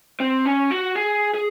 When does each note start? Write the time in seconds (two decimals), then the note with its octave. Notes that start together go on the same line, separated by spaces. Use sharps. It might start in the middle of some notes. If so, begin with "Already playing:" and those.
0.20 C4
0.46 C#4
0.71 F#4
0.96 G#4
1.34 G#4